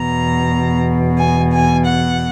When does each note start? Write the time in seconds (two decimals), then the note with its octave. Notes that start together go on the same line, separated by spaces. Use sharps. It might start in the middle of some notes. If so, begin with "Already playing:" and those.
Already playing: E2 B2 A#5
1.18 G#5
1.52 G#5
1.85 F#5